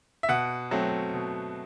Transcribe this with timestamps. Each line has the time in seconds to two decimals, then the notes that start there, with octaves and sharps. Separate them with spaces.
0.23 E5
0.29 B2 F#5
0.71 F#3 A3 C4
1.14 B2